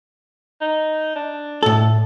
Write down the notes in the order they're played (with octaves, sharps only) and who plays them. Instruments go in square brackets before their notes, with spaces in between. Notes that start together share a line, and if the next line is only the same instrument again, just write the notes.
[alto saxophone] D#4
D4
[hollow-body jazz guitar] A2 A4